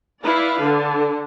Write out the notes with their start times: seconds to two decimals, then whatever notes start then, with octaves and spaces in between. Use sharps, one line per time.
0.24 E4 B4 D5 F5
0.61 D3